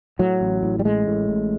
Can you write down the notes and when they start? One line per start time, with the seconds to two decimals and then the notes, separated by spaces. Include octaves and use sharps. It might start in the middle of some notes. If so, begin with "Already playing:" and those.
0.19 A2 F#3
0.41 A1
0.63 A2
0.79 G3
0.85 A1 G#3
1.07 A2
1.30 A1